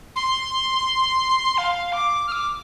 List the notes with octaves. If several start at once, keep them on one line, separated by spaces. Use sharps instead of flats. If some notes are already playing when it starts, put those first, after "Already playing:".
C6
F5
D6
F6
D6